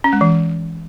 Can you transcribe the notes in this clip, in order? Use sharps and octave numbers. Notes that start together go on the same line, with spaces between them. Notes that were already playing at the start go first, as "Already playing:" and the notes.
C#4
G#3
E3